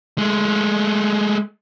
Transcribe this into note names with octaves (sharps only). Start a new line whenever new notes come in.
G#3 A3